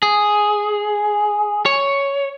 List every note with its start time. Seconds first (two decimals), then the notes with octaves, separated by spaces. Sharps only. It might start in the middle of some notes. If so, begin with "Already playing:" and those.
0.03 G#4
1.66 C#5